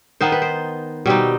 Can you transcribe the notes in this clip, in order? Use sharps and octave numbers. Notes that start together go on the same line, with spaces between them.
D#3 B3 D#4 C5
B4
C5
B2 G3 C4 D#4